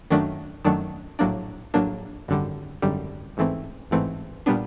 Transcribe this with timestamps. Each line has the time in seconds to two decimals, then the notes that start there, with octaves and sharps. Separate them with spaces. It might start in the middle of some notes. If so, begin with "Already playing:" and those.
0.10 F#2 D#3 F#3 A3 D4
0.65 F#2 D#3 F#3 A3 D4
1.19 A#1 A2 F#3 A#3 D4
1.74 A#1 A2 F#3 A#3 D4
2.28 G#1 F#2 D3 G3
2.82 G#1 F#2 D3 G3
3.37 A1 G#2 E3 A3 C4
3.91 A1 G#2 E3 A3 C4
4.46 A#2 G3 B3 D4